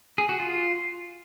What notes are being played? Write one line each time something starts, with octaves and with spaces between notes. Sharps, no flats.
G#4
F#4
F4